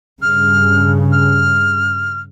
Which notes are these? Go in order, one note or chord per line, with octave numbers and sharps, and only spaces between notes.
G2 C#3 F6
F6